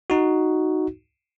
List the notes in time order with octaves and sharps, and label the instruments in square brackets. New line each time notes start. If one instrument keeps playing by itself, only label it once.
[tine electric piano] D#4 F#4